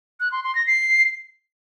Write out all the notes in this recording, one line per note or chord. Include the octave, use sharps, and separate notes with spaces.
F#6
C6
C6
A#6
C7